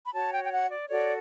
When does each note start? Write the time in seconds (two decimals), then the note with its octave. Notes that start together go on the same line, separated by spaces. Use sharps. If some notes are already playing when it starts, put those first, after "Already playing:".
0.06 B5
0.12 F#4 C#5 A5
0.31 G5
0.44 G5
0.50 F#5
0.69 D5
0.88 F#4 A4 C#5 D5